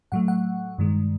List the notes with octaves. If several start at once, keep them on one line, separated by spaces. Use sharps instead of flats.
A2 F#3 A3 F#5
F#5
G2 D#3 G#3